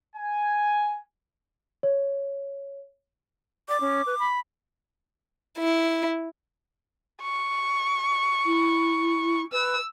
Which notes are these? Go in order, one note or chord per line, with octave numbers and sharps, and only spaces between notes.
G#5
C#5
D5 D6
C#4
B4
B5
E4
C#6
E4
B4 E6